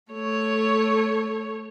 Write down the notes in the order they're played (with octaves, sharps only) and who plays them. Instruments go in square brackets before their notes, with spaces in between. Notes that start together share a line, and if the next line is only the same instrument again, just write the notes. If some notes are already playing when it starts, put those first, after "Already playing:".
[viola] A3 C#5